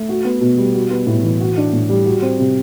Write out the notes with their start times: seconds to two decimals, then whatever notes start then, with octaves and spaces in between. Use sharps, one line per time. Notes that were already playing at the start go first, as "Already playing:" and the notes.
Already playing: A3
0.09 F#4
0.25 B3
0.41 B2
0.58 G3
0.74 F#4
0.91 B3
1.07 A2
1.24 E3
1.40 F#4
1.57 D4
1.73 A2
1.89 G3
2.05 F#4
2.22 C4
2.39 C3